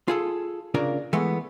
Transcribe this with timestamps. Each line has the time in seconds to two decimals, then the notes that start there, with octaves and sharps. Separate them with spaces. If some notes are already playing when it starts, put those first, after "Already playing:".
0.08 F4 G#4 A4
0.74 C#3 A#3 D4 F4 A#4
1.13 E3 G#3 A3 B3